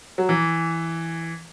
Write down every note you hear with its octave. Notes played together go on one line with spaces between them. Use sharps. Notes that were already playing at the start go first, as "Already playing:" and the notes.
F#3
E3